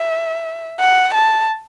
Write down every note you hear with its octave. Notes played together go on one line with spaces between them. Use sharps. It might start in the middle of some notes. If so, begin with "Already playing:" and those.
Already playing: E5
F#5
A5